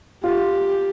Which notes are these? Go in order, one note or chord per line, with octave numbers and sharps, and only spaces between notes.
F4 G4